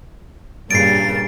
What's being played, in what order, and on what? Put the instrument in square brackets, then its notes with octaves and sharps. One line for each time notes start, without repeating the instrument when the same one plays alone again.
[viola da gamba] G2 [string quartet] A#2 C#3 A#3 [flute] A6 [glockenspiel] C7 D7